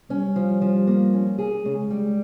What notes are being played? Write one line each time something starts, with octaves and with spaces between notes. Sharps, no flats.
G3 C#4
F3
F3
A#3
C#4
G#4
C#3 G#3
G3